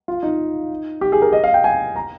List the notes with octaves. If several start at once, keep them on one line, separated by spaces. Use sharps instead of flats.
F4
D#4
G4
G#4
A#4
D#5
F5
G5
G#5
A#5